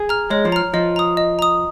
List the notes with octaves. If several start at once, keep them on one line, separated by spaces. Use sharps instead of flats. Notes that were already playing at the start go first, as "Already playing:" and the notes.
Already playing: G#4
A#5 F6
G#3 C#5
F3
A#5 F6
F3 D#5
A#5 D#6
D#5
A#5 D#6